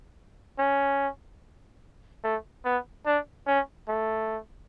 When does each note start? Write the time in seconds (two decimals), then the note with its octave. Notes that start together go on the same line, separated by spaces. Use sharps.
0.59 C#4
2.23 A3
2.65 B3
3.06 D4
3.47 C#4
3.89 A3